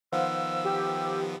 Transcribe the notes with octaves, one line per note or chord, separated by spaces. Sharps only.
D#3 F3 B3 C5 F5 F#5 E6
G4